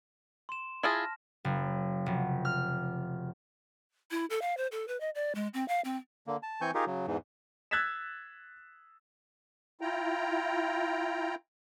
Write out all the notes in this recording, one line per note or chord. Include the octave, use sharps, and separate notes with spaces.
C6 E7
E4 F4 G#4 A5 F6 A#6
F#1
F1
F6
E4
A4
F5
C5
A4
B4
D#5
D5
G#3
C4
F5
C4
D3 A#3
A5
E3 C4 G#5 C#6 G6
D#4 F4 G4 G#4 A#4
C#3 F#3
E2 G#2 E3
E6 F#6 G#6 A6 B6 E7
E4 F4 G5 A#5